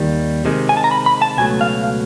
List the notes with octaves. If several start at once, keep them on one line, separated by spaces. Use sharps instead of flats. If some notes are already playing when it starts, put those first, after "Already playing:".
Already playing: D#2 D#3 G3
C3 D#3 G#3
G#5
A5
A#5
B5
B5
A5
C#2 B2 F#3 A3 G#5
F5